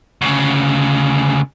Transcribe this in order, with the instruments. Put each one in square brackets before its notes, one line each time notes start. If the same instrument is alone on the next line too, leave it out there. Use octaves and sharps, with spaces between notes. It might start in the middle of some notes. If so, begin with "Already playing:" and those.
[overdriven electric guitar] D2 C#3